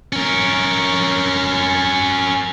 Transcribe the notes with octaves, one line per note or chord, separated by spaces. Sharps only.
C#4 A#4